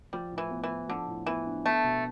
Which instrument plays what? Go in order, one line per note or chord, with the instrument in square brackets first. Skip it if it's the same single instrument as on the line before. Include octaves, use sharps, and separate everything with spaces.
[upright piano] F3 [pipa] G3
[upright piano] A2
[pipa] E3
[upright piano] B3
[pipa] E3
[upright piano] E4
[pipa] D3 [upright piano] F3
[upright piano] A2
[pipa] E3 [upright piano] B3
[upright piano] D4
[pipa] A3 [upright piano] B3
[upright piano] B2